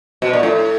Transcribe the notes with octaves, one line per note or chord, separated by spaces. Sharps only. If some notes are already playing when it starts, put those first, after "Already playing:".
B2
A#2
A2